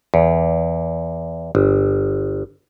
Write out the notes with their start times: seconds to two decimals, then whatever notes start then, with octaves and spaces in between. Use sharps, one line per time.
0.14 E2
1.55 G1